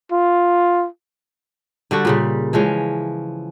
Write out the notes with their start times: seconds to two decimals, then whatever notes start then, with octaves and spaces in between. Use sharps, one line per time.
0.12 F4
1.91 D3 G3 F#4 A4
2.05 A#2 C#3 G3
2.53 E3 F3 G#3 C#4